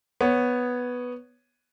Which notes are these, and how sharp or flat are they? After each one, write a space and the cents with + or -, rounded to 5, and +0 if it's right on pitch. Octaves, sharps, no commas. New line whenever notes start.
B3 +0 C#5 +0